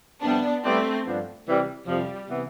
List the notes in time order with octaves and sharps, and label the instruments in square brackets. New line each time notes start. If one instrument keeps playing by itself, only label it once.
[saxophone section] F2 C3 G3 [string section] B3 D4
[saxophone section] G3 B3 E4 G4 D5 [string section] A3 C4
[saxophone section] G2 F3 B3 D4
C3 E3 G3
[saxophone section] F2 C3 F3 [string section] G3
[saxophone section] C3 E3 B3